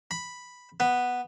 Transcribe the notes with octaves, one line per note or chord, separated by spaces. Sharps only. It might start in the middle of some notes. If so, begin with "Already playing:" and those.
B5
B3